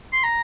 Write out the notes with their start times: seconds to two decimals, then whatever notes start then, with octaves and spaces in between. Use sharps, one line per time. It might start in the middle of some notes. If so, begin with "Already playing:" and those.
0.13 C6
0.23 A#5